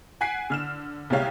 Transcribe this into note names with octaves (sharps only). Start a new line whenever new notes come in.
F#5 G#5 F#6 B6 C7 D7
D3 F6 E7
C2 G3 G#3 C#5 F5 G5